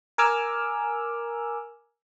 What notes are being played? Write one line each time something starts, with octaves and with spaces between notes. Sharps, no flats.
A#4 G#5 D6 E6 F6